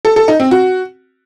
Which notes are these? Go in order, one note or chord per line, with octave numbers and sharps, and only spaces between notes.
A4
A4
D#4
C4
F#4